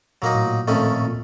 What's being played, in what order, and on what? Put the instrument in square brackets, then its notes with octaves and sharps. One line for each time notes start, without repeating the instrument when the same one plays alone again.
[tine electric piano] A#2 [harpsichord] F#3 A#3 D#4
[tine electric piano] A2
A#2
[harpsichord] F2 D#3 A3 C#4
[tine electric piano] A#2